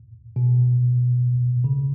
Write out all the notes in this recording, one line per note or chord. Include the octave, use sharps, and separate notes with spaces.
B2
C#3